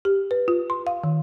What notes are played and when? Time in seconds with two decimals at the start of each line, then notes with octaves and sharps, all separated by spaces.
0.05 G4
0.31 B4
0.48 F4
0.70 C6
0.87 F5
1.04 D#3